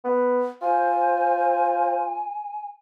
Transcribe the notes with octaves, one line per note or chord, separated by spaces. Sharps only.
B3
F4 C5 G#5